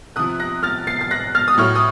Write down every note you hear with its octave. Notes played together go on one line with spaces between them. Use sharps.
C3 F3 D#6 F#6
F#6 A#6
F6 A6
A6 C7
A6
F#6 A#6
F6 A6
D#6
A2 F#3 C#6 F6
D#6